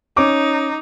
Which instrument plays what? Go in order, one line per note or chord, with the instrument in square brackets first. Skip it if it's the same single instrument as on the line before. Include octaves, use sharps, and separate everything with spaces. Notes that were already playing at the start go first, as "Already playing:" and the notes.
[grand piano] C#4 D6 [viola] D#4